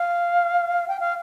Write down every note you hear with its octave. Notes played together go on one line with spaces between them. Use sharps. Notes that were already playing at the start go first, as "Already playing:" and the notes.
Already playing: F5
G5
F5